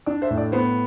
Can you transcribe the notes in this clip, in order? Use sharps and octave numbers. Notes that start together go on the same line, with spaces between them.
D4 D5
C5 E5
A2
D5
B3 C5